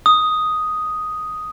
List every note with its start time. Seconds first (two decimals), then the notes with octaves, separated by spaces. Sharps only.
0.06 D#6